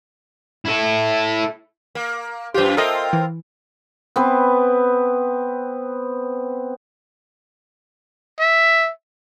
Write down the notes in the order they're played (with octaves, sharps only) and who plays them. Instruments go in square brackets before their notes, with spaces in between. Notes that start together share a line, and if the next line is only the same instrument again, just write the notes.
[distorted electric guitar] E4 A4
[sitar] A#3
[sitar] F#2 F4 [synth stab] G4 C5
[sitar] C4 F4 A#4 [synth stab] A4 D#5 E5
[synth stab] E3
[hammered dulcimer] B3 C4 B4
[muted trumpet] E5